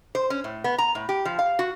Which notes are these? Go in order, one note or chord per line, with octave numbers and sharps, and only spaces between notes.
C5
C#4
A2
B3
A#5
A2
G4
F3
F5
F#4